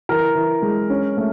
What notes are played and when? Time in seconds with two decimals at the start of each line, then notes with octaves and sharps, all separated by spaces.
0.09 E3 A#4
0.35 E3
0.62 G#3
0.90 C#4
1.17 A3